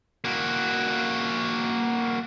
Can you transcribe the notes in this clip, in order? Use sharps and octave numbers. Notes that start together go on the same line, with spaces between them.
A#3 F#4